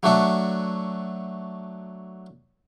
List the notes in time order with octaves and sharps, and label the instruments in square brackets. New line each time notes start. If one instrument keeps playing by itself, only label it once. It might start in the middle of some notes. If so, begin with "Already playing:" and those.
[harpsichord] F#3 A3 D4 F#4 E5